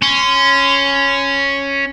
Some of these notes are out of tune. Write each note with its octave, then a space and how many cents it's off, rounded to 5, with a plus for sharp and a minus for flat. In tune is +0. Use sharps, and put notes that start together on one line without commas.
C#4 +0 C6 -30